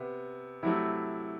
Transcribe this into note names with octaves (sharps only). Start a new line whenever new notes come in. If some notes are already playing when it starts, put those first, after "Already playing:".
Already playing: C3 B3
C3 F#3 A3 E4